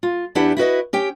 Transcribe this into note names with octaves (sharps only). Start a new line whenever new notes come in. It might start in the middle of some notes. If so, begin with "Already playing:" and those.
F4
E2 D4 E4 G4 B4 F#5
E4 F#4 B4 D#5
C#4 G4 G5